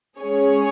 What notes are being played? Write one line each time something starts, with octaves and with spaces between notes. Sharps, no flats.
G#3 C#4 G#4 C#5